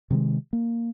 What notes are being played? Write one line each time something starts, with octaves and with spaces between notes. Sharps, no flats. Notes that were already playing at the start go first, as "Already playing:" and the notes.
C3 D#3 G3 G#3
A#3